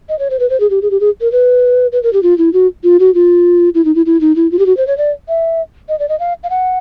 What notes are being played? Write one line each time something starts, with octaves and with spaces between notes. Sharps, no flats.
D#5
C#5
C5
B4
C5
G#4
G4
G#4
G4
G#4
A#4
B4
B4
A#4
G4
F4
E4
F#4
F4
F#4
F4
E4
D#4
E4
E4
D#4
E4
F4
G4
F#4
C5
C#5
D5
E5
D#5
D5
D#5
F5
F5
F#5